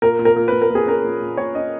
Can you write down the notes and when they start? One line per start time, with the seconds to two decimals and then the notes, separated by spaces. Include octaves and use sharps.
0.02 A#2 A#4
0.19 A#2
0.25 A#4
0.36 A#2
0.48 A#2 B4
0.62 A#4
0.70 A#2 G#4
0.87 C#4 A#4
1.04 A#2
1.21 A#2
1.37 A#2 C#5
1.55 C#4 D#5